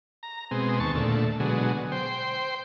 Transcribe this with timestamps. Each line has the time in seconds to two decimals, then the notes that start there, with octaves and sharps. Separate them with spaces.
0.23 A#5
0.51 B2 G#3 C4
0.80 D#2 A5 C#6
0.95 A#2 D3 A3
1.40 B2 D3 F#3 G#3
1.92 C5 G5